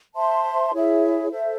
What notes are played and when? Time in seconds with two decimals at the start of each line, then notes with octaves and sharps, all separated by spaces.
0.15 C5 E5 A5 C6
0.72 E4 G#4 C#5 E5
1.29 A4 C5 E5